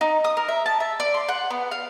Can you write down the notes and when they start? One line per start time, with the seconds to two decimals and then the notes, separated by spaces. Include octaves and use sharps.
0.01 D#4
0.24 D#6
0.37 A#4
0.49 E5
0.66 A5
0.80 E5
1.00 D5
1.14 C6
1.29 F#5
1.50 B3
1.71 F5